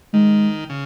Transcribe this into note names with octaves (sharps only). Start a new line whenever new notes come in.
D#3 G#3
C#3